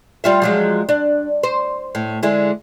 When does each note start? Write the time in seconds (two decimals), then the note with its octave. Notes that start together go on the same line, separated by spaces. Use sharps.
0.24 G3 F4 E5
0.42 F3 F#3 G#3
0.89 D4
1.43 C5
1.95 A2
2.23 D3 G#3 E4